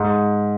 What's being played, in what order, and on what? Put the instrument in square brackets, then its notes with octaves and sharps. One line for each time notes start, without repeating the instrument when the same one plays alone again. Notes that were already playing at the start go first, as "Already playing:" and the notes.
Already playing: [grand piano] G#2